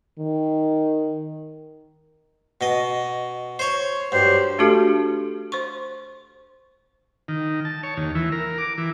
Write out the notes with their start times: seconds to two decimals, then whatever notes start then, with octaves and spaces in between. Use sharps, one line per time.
0.19 D#3
2.61 B2 D#5
3.59 C5 C#5
4.12 G2 F#3 G4 C5
4.59 A3 D4 F#4 G4 A4
5.52 C5 C6 C#6
7.28 D#3
7.65 A5
7.83 C#5
7.97 D#2
8.15 E3
8.32 A#4
8.58 D6
8.78 E3